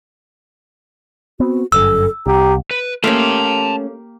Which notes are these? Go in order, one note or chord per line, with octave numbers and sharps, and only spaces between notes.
B3 C4 F#4
G1 F#2 A4 E6
C2 G4 A#5
B4
A3 A#3 C#4 G4 F5 A5 C6